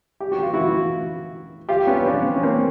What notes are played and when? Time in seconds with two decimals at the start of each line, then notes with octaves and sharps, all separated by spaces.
0.20 G4
0.32 F#4
0.43 F4
0.54 E4 F#4
1.69 F4 G4
1.87 B3 C#4
2.06 C4 D4
2.36 C#4
2.43 A#3 C4